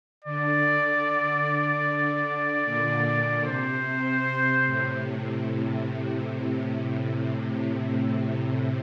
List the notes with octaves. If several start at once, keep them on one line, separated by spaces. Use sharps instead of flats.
D3 D5
A#2
A#2
C3 C5
C3
A2